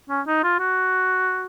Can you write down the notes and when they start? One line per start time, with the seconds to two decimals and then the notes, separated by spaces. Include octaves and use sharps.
0.10 C#4
0.27 D#4
0.44 F4
0.60 F#4